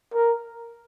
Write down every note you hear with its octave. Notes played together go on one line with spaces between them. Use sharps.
A#4